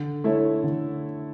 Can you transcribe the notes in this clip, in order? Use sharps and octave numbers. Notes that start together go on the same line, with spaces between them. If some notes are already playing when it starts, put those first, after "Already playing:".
Already playing: D3
A3 E4 A4 C#5
D3